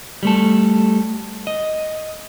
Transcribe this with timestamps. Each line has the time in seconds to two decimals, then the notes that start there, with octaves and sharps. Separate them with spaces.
0.23 G3 A3 A4
1.47 D#5